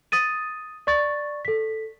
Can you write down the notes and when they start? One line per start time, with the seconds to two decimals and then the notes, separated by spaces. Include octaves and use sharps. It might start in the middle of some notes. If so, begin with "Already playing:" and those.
0.12 D#6 A6 D#7
0.87 D5 C#6 A6
1.45 A4 B6